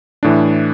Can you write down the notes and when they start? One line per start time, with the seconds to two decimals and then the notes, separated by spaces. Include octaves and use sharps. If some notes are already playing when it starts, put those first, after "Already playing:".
0.23 A2 E3 D4